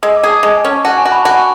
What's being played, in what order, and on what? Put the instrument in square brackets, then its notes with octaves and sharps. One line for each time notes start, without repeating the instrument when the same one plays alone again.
[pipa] G#3 [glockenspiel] E6
[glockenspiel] D6
[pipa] G#4
[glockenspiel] A5
[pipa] G#3 [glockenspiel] A5
[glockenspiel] G#5
[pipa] C#4
[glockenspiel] A5
[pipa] F#4 [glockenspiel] A5
[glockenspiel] G#5
[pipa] F#4
[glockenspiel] B5
[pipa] F#4 [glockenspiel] A5
[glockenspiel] G#5